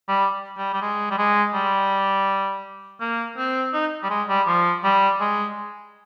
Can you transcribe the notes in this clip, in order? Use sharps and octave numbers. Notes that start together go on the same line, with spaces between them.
G3
G3
G3
G#3
G3
G#3
G3
A#3
C4
D#4
G3
G#3
G3
F3
G3
G#3